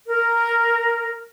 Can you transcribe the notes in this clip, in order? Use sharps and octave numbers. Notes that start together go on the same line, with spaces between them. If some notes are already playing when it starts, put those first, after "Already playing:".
A#4